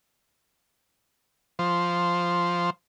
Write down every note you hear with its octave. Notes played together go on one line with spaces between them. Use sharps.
F3 C5